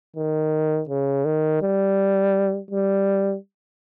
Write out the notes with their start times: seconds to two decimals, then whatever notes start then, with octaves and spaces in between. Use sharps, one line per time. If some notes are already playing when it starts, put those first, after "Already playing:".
0.16 D#3
0.89 C#3
1.25 D#3
1.62 G3
2.71 G3